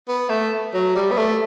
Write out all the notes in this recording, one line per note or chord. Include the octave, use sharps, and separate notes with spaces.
B3
A3
F#3
G3
B3
A3